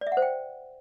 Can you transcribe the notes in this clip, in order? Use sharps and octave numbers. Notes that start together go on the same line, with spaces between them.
D5
E5
F#5
C5
G5